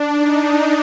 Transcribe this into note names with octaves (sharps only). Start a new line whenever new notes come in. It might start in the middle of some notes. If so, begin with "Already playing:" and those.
Already playing: D4
D#4